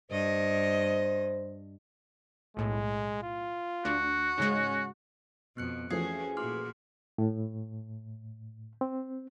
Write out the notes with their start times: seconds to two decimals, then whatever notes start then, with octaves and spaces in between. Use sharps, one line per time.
0.11 G2 C5 D#5
2.57 B1 A2 G#3
3.23 F4
3.85 D2 D4 F#4
4.38 G#2 C#3 G#3 C#4
5.57 F2 B2 B3 F#6 C#7
5.90 E3 F3 A3 C#4 F#4 G#4 C7
6.37 A#2 F#4 C6 D6 F6
7.18 A2
8.81 C4